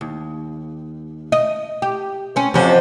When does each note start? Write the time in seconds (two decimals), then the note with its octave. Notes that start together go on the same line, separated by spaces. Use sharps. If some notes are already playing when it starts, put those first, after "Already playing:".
0.01 D#2
1.32 D#5
1.82 G4
2.36 C4 C#4
2.54 F2 C3 C#4 F#4 C5